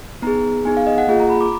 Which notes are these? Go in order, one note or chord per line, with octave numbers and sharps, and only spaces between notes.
B3 D#4 G#4 A#5
B3 D#4 G#4 G#5
F5
D#5
F#5
A#3 F4 G#4
A#5
B5
D6